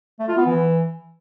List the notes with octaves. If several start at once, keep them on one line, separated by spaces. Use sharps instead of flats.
A3
F4
B3
E3